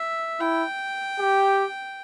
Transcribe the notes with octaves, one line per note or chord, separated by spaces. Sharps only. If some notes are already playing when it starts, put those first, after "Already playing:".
Already playing: E5
E4 G5
G4